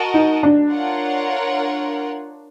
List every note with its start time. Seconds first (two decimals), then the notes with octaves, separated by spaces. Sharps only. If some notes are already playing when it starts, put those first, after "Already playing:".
Already playing: F#4 A#4 D#5 F#5 A5
0.14 D#4
0.43 D4
0.71 F4 A#4 C#5 F#5